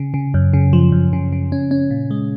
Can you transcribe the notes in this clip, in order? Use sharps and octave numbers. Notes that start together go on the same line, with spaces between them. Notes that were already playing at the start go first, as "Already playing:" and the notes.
Already playing: C#3
C#3
F#2
C#3
F3
F#2
C#3
C#3
C#4
C#4
A#2
G#3